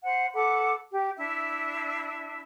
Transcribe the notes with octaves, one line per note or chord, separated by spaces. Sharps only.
C5 F#5
A4 B4 F#5 D6
G4
D4 E4 E5